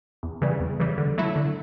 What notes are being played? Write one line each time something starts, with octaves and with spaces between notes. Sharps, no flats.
E2
C#3 E3 G3
E2
C#3 E3 G3
D3
F#3 A3 E4
D3